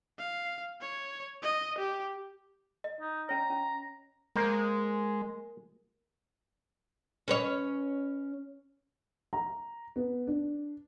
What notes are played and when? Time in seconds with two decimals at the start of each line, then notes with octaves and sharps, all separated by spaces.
0.19 F5
0.81 C#5
1.42 D#5
1.78 G4
2.84 D#5
3.01 D#4
3.29 C#4 C#5 A#5
3.50 C#4
4.36 G#3 A#3 A#4 C5
7.28 C#4 B4 C#5
9.33 A#5
9.96 B3
10.27 D4